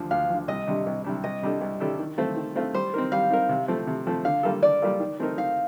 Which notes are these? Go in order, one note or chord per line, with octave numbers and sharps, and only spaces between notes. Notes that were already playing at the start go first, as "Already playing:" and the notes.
Already playing: D2 D3 F3
D2 F5
D3 F3
C2 D#5
C3 G3 D4
C2
C3 G3 D4
C2 D#5
C3 G3 D4 A4
C2
C3 G3 D4 A4
D#3
A3 C4 F4 C5
D#3
A3 C4 F4 C5
G3 C5
C4 D#4 A#4
G3 F5
C4 D#4 A#4
C3
F3 A3 C4
C3
F3 A3 C4
D3 F5
G3 A#3 F4 A4
D3 D5
G3 A#3 F4 A4
D#3
A3 C4 D#4 A#4
D#3 F5